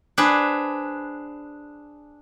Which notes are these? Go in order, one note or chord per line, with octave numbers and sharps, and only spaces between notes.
D4 G#4 B4 C5